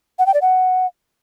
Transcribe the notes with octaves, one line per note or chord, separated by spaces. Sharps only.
F#5
G5
D5
F#5